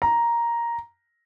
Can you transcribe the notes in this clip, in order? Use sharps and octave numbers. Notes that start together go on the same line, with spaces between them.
A#5